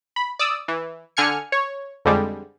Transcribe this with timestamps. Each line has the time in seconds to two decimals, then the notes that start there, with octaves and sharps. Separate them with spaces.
0.16 B5
0.39 D5 D#6 E6
0.68 E3
1.17 D3 G#5 F6 G#6 C#7
1.52 C#5
2.05 F2 D3 G3 G#3